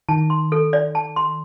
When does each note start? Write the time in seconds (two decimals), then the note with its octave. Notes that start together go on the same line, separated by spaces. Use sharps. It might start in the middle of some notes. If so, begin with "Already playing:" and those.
0.09 D#3 A5
0.30 C6
0.52 A4
0.73 D5
0.95 A5
1.16 C6